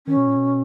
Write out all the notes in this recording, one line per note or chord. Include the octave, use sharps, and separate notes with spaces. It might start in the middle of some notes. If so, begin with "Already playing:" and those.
D#3 C#4
B2
A#2
B2